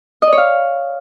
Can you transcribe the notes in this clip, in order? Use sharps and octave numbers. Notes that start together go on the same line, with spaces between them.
D#5
D5
C#5
F5